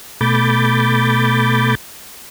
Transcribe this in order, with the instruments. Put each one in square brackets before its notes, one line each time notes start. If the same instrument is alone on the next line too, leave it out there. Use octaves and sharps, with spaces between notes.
[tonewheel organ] B2 A3 B5 D6 G6 A6